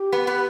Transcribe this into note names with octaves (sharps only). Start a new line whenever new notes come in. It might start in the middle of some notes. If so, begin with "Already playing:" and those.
Already playing: G4
B3
B3